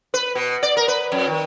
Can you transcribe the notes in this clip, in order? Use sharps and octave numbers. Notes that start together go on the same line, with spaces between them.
B4
B2
D5
A#4
B4
F2
D#3